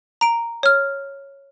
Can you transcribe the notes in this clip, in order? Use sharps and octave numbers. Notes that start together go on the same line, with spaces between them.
A#5 D7
C#5 F6